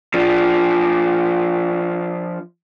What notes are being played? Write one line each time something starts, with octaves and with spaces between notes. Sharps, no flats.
F3 D4